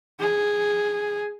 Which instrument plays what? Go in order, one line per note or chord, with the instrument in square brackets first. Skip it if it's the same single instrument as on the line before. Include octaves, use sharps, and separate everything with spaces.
[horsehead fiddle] G#4